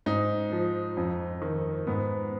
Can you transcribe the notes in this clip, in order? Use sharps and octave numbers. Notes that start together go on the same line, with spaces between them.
G#2 D#4
F3
F2
D#3
G#2 B3